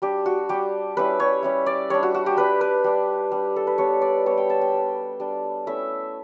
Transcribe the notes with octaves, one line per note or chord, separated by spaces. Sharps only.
G3 D4 G4
F#4
G3 D4 G4
G3 C#4 E4 B4
C#5
G3 C#4 E4
D5
G3 D4 C#5
F#4
F#4
G4
G3 D4 B4
B4
G3 D4
G3 D4
A4
B4
G3 B3 D4 C#5
D5
G3 B3 D4 C#5
G5
A5
G5
G3 D4
G3 D4
A3 C#4 E4 E5